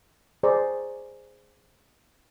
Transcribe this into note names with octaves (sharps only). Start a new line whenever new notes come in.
G#4 C5 D5 A#5 C#6